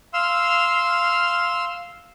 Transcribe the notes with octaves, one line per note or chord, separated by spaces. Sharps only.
F5 C6 E6 F6